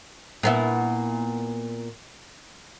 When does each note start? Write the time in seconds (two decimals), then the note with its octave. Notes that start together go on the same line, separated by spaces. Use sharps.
0.43 A#2 B3 E4